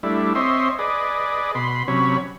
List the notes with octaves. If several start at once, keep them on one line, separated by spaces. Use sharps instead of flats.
G3 A3 D4 E4
C4 C#5 D#5 E5 C6
G#4 B4 D5 D#5
B2 B5 C6
C3 F#3 C#4 C#5 B5